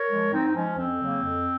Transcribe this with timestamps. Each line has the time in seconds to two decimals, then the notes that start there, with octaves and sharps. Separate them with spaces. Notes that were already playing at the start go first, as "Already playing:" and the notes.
Already playing: A#4 C#5
0.11 F3 G#3
0.33 G#2 C4 D#4
0.47 C4
0.55 F3 G#3 C#4
0.78 F2 C4
1.01 C#3 F#3 A#3
1.23 F2